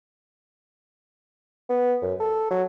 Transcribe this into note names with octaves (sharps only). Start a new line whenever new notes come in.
B3
F#2
A4
F#3